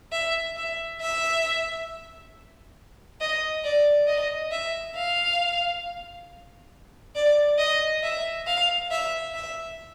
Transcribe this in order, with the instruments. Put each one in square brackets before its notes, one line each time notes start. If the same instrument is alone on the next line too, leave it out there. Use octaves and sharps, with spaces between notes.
[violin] E5
E5
E5
D#5
D5
D#5
E5
F5
D5
D#5
E5
F5
E5
E5